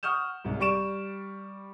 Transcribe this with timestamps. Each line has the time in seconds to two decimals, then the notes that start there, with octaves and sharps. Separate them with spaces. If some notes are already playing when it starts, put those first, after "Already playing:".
0.03 F#5 C#6 D#6 F6 G6 E7
0.45 C2 G#2
0.60 G3 D5 C#6 D7 E7